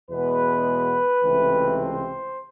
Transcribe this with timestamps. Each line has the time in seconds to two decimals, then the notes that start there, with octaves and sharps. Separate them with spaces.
0.10 E2 B2 G#3 B3 B4
1.23 C#2 C3 E3 A3 C4
1.80 C5